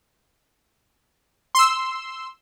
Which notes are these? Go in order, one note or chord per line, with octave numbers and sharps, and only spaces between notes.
C6 E6